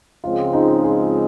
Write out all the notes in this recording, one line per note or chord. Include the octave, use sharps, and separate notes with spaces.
C#2 C#3 F3 G#3 C4 F4
D#4
G#4